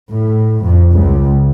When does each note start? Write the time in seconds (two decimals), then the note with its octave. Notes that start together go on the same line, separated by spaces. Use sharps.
0.11 A2
0.62 F2
0.93 C#2